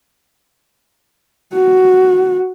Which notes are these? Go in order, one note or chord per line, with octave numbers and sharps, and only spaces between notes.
F#4